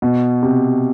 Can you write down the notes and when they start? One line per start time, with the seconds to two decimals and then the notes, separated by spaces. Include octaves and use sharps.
0.02 B2
0.43 C3